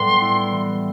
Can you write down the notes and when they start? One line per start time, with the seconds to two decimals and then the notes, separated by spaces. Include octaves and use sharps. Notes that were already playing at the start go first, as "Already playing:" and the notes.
Already playing: A2 G3 B3 C6
0.22 E4
0.52 E3